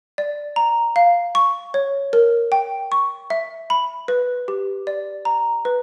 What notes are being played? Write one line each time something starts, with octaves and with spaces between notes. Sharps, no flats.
D5
A#5
F5
C#6
C#5
A#4
G5
C#6
E5
B5
B4
G4
D5
A#5
B4